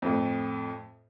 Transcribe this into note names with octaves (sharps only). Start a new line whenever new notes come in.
F2 A2